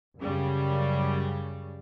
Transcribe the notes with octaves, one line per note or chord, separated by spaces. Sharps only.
F#2 C#3 G3